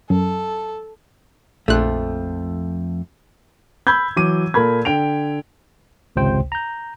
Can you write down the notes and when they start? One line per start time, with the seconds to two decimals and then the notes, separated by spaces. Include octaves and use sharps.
0.10 F#2 A4
1.68 A#1 F2 F3 A3 F#6
3.87 B5 E6 G6 G#6
4.16 E3 F#3 D6 D#7
4.54 A#2 A4 A#4 B5 G#6
4.85 D3 G5 D7 F7
6.16 G#1 C#2 C3 C5 G5
6.52 A#5 G6